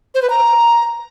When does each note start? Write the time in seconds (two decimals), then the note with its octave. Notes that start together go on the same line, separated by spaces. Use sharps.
0.15 C5
0.22 B4
0.30 A#5